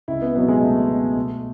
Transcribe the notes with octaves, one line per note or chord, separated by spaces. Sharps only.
C#2 E4
B3
B2 F#3 B3
G#3
C#2 A3
B2 F#3
B1